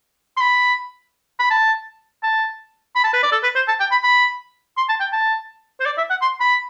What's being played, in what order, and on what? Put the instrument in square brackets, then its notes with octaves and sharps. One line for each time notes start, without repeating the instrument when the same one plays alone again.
[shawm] C6
B5
B5
A5
A5
B5
A5
B4
D5
A4
B4
C5
A5
G5
B5
B5
C6
A5
G5
A5
C5
D5
E5
F#5
C6
B5